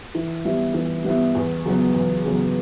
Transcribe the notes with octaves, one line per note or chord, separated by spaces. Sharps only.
E3
G3 B3 E4
E3
G3 B3 E4
E2
C#3 F#3 B3
E2
C#3 F#3 B3